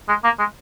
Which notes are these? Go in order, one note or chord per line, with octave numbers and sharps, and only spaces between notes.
G#3
A#3
G#3